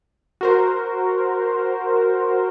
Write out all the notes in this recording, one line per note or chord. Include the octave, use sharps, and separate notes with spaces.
F#4 A#4 C5